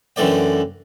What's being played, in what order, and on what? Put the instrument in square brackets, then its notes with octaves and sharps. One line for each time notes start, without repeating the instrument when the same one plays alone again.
[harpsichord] F#2 D3 E3 A3 D5 G5